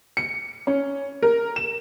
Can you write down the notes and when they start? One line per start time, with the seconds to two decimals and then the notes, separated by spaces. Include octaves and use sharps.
0.17 C#7
0.67 C#4
1.23 A#4
1.56 E7